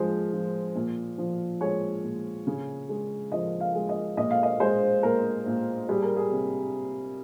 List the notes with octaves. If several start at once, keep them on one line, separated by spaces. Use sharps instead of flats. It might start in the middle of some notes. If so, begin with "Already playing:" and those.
Already playing: F3 G#3 C5
F3
A#2
F3
G#3 C#5
A#2
C#3
G#3
F3 D#5
F5
G#3
D#5
A#2 D#5
F5
D#5
G#3 C5
A#2 A#4
A#2
G3 G#4
A#4
G#4
C3